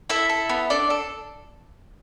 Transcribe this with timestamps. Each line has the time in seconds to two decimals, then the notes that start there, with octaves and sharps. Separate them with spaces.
0.10 E4 A4 E5
0.29 A4
0.49 B3
0.70 D4 A4 D5
0.90 A4